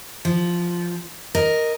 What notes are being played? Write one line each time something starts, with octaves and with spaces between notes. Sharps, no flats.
F3
A#4 D#5